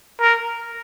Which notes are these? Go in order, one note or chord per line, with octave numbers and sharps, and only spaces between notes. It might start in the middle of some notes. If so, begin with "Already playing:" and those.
A#4